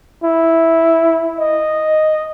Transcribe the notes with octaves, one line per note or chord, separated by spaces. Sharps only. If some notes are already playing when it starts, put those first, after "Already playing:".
E4
D#5